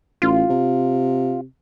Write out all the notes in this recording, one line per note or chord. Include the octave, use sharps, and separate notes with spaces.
A1 F4
C3